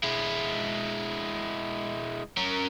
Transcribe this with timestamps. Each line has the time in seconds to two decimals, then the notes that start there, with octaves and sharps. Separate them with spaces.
0.04 G#3 E4
2.38 C#4 A#4